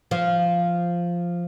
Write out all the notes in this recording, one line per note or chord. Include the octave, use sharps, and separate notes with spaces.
F3